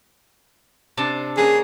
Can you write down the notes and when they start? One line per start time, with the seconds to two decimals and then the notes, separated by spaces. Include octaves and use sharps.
0.97 C3 D4 A5
1.37 A#3 C#4 G#4 B4